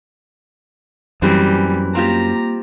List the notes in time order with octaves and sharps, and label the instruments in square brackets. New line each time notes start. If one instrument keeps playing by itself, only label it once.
[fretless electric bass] F#2 [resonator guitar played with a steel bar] A#2 E3 C4 [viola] G3
[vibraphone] A#3 [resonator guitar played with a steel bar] C4 F4 G4 [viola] A#5